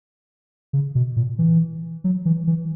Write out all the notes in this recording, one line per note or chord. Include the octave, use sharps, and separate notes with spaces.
C#3
B2
A#2
E3
F#3
E3
E3